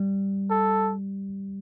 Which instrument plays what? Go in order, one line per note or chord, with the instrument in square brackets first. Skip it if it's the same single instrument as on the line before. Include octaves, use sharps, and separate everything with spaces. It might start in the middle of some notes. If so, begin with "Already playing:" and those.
Already playing: [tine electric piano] G3
[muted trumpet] A4